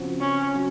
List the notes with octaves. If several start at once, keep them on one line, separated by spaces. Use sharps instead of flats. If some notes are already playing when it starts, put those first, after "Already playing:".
Already playing: C#3 F3 C4 F#4
C#4
C#3 F#3